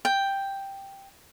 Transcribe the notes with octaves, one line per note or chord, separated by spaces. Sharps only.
G5